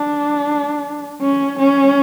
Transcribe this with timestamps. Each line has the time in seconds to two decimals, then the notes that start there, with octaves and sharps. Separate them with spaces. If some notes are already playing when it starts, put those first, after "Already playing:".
Already playing: D4
1.21 C#4
1.59 C#4